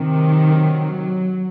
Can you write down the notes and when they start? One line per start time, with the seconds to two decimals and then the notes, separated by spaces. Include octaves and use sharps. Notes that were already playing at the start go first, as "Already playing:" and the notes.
Already playing: C3 D#3
0.14 F#3